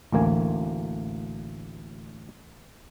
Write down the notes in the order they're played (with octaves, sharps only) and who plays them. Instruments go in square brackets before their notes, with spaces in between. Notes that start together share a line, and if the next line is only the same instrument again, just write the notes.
[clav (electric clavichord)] A1 D2 A#3 G#5